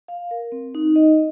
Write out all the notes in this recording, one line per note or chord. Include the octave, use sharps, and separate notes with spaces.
F5
A#4
C4
D#4
D#5